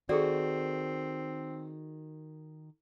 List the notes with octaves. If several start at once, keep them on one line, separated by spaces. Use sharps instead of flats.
D#3 C4 F#4 G#4 A4 D5